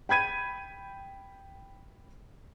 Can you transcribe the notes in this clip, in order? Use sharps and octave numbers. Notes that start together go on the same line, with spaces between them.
G5 B5 G#6 D#7